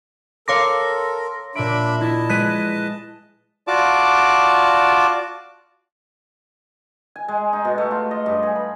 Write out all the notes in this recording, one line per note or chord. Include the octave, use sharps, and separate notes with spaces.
A4 A#4 C#5 F5 C6 D6 A#6
A#2 D4 E5 B5 D7
E4 D#5 A5
G#3 B4 F#6 B6 D#7
F4 F#4 D5 A5 D6
G#5
G#3
D#4
B2
A3
F4
D#5
G2
G#4
B5